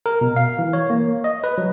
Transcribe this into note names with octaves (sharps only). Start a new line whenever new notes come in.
A#4
B2
F5
E3
C#5
A#3
D#5
B4
F#3